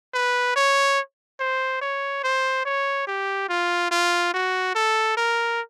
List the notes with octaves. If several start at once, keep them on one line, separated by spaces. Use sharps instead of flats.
B4
C#5
C5
C#5
C5
C#5
G4
F4
F4
F#4
A4
A#4